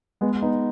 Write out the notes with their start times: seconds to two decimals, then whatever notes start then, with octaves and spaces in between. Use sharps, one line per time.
0.21 G#3 B3
0.42 B3 D#4